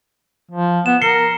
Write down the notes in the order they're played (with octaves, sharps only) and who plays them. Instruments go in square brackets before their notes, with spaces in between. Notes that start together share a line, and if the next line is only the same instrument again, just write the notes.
[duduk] F3
[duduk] B3 [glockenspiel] E7
[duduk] A#4 [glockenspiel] C7 C#7 G7